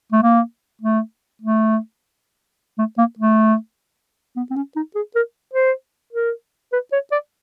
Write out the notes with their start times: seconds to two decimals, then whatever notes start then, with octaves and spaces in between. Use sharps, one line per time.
0.12 A3
0.23 A#3
0.82 A3
1.42 A3
2.78 A3
2.98 A#3
3.19 A3
4.36 B3
4.51 C4
4.56 C#4
4.76 D#4
4.95 G#4
5.15 A#4
5.54 C5
6.13 A#4
6.72 B4
6.92 C#5
7.12 D5